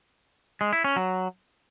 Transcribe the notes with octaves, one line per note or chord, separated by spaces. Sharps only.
G#3
E4
C#4
F#3